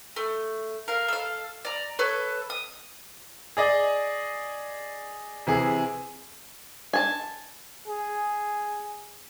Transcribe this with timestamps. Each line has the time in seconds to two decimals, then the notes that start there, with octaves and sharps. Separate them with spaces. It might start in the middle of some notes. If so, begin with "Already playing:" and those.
0.16 A3
0.88 A#4 F5
1.08 A4 F5
1.65 D5 A#5
1.99 A4 B4 C#5
2.50 D#6
3.57 G#4 D5 D#5
5.47 C3 E3 G#4
6.93 G#5 A5
7.88 G#4